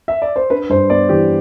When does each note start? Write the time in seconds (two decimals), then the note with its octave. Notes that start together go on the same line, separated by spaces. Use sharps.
0.08 E5
0.22 D5
0.36 C5
0.50 D4 B4
0.69 G2 C5
0.90 B3 D5
1.09 E3 G4